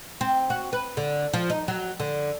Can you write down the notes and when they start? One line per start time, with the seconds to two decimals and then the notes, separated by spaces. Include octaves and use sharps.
0.21 C4
0.50 F#4
0.73 B4
0.97 D3
1.33 F3
1.50 D#4
1.68 F#3
2.00 D3